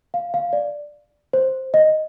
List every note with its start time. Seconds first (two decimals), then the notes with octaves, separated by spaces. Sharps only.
0.14 F5
0.34 F5
0.53 D5
1.33 C5
1.74 D#5